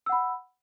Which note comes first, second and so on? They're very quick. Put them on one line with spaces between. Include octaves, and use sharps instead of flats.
E6 F#5 B5